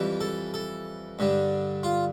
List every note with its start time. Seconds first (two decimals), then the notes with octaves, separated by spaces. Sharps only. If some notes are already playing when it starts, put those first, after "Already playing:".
Already playing: F2 E3 G3
0.21 A4
0.54 A4
1.19 G2 D3 G3
1.83 F4